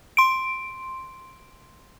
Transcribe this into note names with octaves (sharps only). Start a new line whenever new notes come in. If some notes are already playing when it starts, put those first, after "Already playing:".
C6 D7